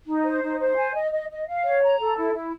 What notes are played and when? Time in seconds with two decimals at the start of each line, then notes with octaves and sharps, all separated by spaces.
0.07 D#4
0.24 C5
0.42 D#4
0.59 C5
0.77 G#5
0.94 D#5
1.11 D#5
1.29 D#5
1.46 F5
1.64 C#5
1.81 A#5
1.99 A4
2.16 E4
2.33 E4